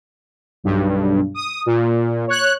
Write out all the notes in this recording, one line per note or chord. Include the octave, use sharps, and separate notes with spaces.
B1 G2
D#6
A#2
C#5 F#6